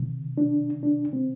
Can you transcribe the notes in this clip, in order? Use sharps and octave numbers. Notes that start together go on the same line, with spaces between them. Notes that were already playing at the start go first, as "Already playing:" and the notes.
Already playing: C3 D#3
D4
D4
C4